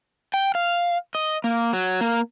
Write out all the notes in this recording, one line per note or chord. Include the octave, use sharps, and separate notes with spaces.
G5
F5
D#5
A#3
F#3
A#3